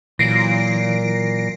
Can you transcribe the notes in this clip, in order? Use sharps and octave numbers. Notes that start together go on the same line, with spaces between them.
A#2 E3 F#3 A#6 C7 D7